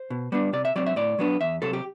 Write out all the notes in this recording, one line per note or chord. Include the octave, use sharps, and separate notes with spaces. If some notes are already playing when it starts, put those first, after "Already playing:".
Already playing: C5
B2
G3 B3 D4
C3 D5
E5
F#3 C4 D5
E5
A2 D5
F#3 B3 D4
E2 E5
C3 F#3 A4
G4